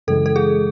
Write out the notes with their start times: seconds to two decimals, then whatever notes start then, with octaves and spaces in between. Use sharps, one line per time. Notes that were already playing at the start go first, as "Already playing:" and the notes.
0.07 F#2 C#3 E3 G#3 A4
0.26 A4
0.36 G#4